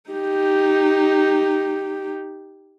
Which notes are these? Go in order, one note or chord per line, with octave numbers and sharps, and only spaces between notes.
D#4 G4